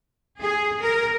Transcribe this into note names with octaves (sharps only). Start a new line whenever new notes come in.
G#4
A#4